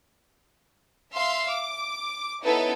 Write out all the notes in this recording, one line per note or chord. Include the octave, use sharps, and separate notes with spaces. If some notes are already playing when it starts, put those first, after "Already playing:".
E5 F5 C6
D6
B3 C#4 D#4 E4 A4 B4